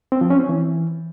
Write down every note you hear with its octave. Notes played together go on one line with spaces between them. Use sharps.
C4
F3
C#4
C4
E3